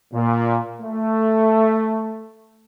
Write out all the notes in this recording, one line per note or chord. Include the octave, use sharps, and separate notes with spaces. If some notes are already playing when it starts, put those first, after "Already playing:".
A#2
A3